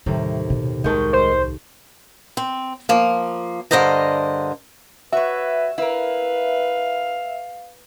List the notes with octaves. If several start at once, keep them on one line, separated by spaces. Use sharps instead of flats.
D#2 A2 C3 G3
B2
C2 D#3 G#3 A5 C#6 G6
C5
C4
F3 A#3
G2 D3 A#4 C5 D#5 A#5
F#4 B4 C#5 E5
E4 A#4 B4 F5